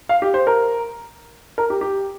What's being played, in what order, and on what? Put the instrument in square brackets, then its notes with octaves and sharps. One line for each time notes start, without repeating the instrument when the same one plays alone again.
[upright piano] F5
G4
C5
A#4
A#4
G4
G4